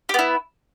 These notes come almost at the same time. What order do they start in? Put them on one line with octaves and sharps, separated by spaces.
G4 B3 E4